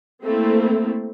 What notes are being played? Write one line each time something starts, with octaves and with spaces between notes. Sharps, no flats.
A3 A#3 C4 E4 A4